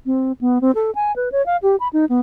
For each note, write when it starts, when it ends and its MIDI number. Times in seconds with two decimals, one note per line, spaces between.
0.06 0.32 60
0.41 0.61 59
0.61 0.72 60
0.75 0.91 69
0.95 1.15 80
1.16 1.29 71
1.32 1.44 73
1.46 1.57 77
1.63 1.76 67
1.80 1.88 83
1.93 2.05 63
2.09 2.21 59